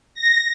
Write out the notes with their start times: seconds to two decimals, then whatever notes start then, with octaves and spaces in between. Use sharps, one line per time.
0.14 A#6